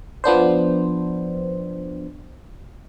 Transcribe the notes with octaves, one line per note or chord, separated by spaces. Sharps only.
F3 B3 D4 C5